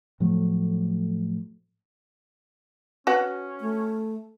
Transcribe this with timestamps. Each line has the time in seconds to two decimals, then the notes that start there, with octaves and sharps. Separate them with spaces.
0.20 A2 F3 F#3 A3
3.07 C#4 F#4 B4 F#5
3.61 A3